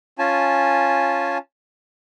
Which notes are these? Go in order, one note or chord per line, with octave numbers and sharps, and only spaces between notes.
C#4 F4 G#5 A5